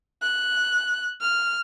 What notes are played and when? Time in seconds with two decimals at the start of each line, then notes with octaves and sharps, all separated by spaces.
0.22 F#6
1.21 F6